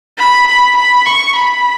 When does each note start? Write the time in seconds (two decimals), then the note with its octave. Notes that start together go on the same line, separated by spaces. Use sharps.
0.18 B5
0.47 B5
0.77 B5
1.06 C#6
1.35 B5